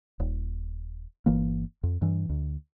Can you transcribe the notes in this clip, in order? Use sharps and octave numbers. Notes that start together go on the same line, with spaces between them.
D#1
G1 E3 A#3
F2
G2 E3
D2